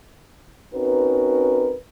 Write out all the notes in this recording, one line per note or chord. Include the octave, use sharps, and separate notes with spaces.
C4 C#4 D#4 F#4 A#4 B4